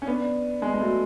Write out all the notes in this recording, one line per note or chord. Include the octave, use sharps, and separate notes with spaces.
C#4
B3 D4
G#3 B3
G#3
F#3 A3